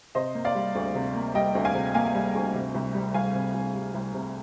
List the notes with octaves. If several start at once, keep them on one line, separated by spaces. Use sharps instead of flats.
C3 C5 D#5
A#3
D5 F5
G3
D2
C3
A#3
G3 D#5 G5
D2
F5 G#5
C3
A#3 F5 G#5
G3
D2
C3
C2
G3
C2 F5 G#5
C3
C2
G3
C2
C3